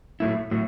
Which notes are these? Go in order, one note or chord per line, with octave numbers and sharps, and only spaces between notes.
A2 F#3 A3 E4
A2 F#3